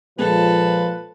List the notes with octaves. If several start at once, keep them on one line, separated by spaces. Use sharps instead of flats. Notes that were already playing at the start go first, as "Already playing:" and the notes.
A#2 F3 G#3 A4 B4